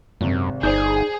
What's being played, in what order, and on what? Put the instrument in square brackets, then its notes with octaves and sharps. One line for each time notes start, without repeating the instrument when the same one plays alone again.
[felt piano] G#1 C3 [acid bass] F#2
[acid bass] G1 [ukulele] D#4 [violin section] G#4 [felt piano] C5 D5 G6